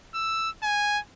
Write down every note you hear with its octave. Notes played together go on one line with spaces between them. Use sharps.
E6
G#5